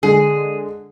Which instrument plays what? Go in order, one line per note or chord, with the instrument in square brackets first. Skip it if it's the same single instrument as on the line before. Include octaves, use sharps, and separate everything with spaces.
[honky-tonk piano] D3 G#3 [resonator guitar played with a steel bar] G#4